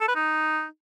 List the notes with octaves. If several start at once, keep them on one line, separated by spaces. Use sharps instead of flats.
A4
B4
D#4